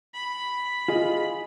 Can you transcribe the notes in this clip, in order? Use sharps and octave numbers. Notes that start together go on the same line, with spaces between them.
B5
F4 G#4 D#5